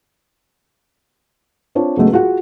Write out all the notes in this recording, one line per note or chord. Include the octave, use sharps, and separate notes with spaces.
C4 D4 F4 C#5
C#2 F#3 G#3 A3 B3
F4 F#4 G#4 F#5